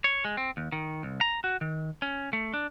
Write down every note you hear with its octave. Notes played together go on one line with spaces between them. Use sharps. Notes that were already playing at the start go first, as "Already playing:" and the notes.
C#5
G#3
C4
D#2
D#3
C2
A#5
F#4
D#3
C#4
A3
D4